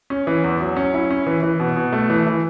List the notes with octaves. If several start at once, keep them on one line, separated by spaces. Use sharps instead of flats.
C#4
E3
E2
F#3
C#4
E4
C#4
E3
E3
B2
B2
A3
E3
E3